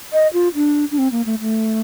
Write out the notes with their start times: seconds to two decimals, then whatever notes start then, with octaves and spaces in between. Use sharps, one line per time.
0.13 D#5
0.33 F4
0.55 D4
0.91 D4
0.98 C4
1.12 A#3
1.26 A3
1.40 A3